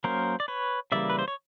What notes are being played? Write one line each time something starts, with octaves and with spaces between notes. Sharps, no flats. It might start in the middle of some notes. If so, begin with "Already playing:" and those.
F#3 A#3 C#4 A#4 C5
D5
B4 C#5
C#3 E3 G3 A#3 D5 E5
B4
C5
C#5